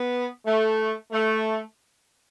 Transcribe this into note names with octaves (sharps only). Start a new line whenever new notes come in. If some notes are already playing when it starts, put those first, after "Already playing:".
Already playing: B3
A3
A3